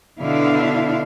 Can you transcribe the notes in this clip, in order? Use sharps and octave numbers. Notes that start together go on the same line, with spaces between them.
B2 D3 D4 E4 F5